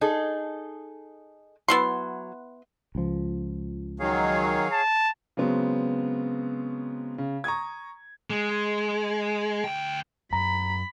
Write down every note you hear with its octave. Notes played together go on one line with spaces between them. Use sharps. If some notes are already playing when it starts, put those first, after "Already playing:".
D#4 G#4 A4
F#3 B3 E4 C6
C#2 F3
D#3 F#3 G#4 C#5 F5
A5
C#3 F#3 G#3 B3 C4
C#3
A#5 C#6 D#6 G#6
G#3
D2 G5
F#2 A#5 B5